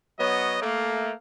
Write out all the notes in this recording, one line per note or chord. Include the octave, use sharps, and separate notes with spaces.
F#3 B3 C#5 D#5
A3 A#3